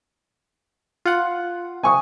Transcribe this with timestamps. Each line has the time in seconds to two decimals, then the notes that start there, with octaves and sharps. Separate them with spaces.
1.06 F4 F#5
1.83 G#5 C#6 D#6